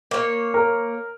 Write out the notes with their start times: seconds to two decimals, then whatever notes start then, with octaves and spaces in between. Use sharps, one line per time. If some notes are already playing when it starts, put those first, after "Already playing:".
0.11 A#3 C#5
0.54 A#4